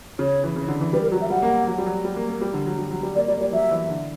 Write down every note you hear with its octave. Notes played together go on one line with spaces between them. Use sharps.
C#3 C#5
E3
C#3
D3
E3
G3 B4
A#4
F#3 F#4
E5
G3 F#5
A#3
F#3
G3
F#3
G3
A#3
A#3
G3
D3
F#3
G3
F#3
G3
A#3 D5
G3 D5
A#3
G3 D5
F#3 E5
E3
D3